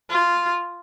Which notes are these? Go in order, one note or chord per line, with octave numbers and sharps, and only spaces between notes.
F4